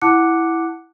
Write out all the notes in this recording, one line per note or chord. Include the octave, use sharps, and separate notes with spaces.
E4 F#5 A5 D6 F#6 C#7